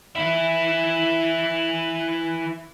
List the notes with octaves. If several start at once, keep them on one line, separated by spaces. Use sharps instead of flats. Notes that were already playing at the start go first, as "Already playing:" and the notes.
E3 E4